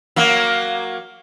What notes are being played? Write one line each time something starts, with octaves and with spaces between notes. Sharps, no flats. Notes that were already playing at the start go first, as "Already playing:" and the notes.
F#3 A#3